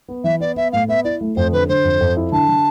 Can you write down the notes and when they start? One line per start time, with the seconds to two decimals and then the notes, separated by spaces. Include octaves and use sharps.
0.08 B3
0.24 E3 E5
0.40 B3 D5
0.56 B3 E5
0.72 A2 F5
0.88 B3 E5
1.04 E4 D5
1.21 A3
1.36 F2 C5
1.53 D3 B4
1.69 D3 C5
1.84 F2
2.01 F2
2.17 E4
2.32 D3 A5
2.49 D3